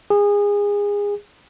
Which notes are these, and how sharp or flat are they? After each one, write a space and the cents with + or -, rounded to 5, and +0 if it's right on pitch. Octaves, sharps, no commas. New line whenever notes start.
G#4 -25